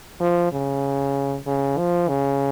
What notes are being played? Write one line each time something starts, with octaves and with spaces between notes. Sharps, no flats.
F3
C#3
C#3
F3
C#3